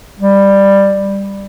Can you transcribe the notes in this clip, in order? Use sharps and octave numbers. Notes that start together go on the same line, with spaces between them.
G3